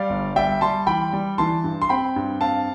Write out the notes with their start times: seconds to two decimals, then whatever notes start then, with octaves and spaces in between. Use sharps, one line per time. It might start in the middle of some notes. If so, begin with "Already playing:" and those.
Already playing: G3 D5 F5
0.10 G1
0.36 G3 E5 G5
0.61 G3 A5 C6
0.87 E3 G5 B5
1.13 G3
1.38 E3 A5 C6
1.64 G2
1.82 C6
1.89 C4 G5 B5
2.16 G2
2.41 C4 F5 A5